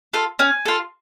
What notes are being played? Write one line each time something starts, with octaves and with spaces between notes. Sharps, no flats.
F4 A4
C#4 G#5
F4 A4